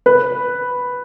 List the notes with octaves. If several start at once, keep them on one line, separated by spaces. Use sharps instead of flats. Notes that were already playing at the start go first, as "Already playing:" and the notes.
B4